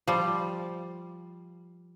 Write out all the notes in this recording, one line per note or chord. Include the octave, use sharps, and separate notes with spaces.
F3 G3